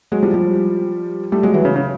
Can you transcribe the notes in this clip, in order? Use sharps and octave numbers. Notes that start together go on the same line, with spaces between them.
F#3 G#3
F3 G3
F3 G3
G3 A3
F#3 G#3
E3 F#3
C#3
C#3